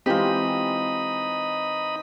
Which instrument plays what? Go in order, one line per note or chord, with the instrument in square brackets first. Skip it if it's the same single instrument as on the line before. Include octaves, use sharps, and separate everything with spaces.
[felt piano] E3 G#3 C4 [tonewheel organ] D#4 D#5 B5 [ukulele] F4 G4